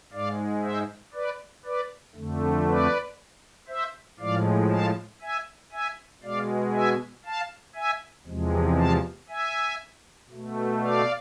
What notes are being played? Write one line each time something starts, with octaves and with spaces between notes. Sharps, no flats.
G#2 G#3 D5 F5
C5 E5
B4 D5
B4 D5
F2 D3 A3
B4 D5
C5 E5
A2 F3 G#3 D5 F5
F5 A5
E5 G#5
E5 G#5
B2 G#3 D5 F5
E5 G#5
F5 A5
E5 G#5
E2 C3 F3 G#3
F5 A5
E5 G#5
B2 A3
D5 F5